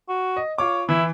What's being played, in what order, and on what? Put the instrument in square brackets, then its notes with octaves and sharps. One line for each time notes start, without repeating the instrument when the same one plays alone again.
[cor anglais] F#4
[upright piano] D#5
[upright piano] F4 D6 [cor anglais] C#5
[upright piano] E3 [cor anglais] E4